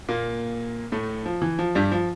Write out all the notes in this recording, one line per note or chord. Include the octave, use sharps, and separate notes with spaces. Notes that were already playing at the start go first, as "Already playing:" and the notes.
A#2 A#3
A2 A3
F3
E3
F3
G2 G3
F3